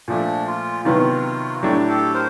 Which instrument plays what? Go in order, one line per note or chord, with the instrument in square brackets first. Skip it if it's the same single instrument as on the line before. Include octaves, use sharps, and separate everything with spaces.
[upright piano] A#2 F3 A3 [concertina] D4
[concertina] F4
[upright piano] C3 D#3 F#3 B3 [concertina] F4
[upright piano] A2 F#3 A3 D4 [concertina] G4
[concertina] G4 A4
A#4 C5